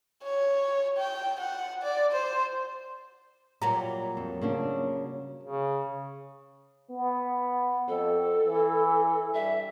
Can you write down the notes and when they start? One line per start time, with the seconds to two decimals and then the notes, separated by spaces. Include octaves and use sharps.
0.23 C#5
0.97 G5
1.40 F#5
1.83 D5
2.12 C5
3.62 A#2 F#3 G3 A#5
4.17 F2
4.42 C#3 A#3 D4
5.44 C#3
6.90 B3
7.88 F2 A4
8.46 E3
9.34 G2 E5